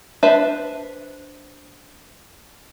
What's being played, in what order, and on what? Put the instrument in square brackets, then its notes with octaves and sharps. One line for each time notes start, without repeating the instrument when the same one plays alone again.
[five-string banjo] D4 B4 C5 E5